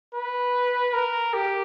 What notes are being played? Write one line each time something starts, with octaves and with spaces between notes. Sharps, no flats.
B4
A#4
G4